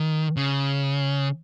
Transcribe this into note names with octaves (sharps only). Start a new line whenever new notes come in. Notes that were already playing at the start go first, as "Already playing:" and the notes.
Already playing: D#3
C#3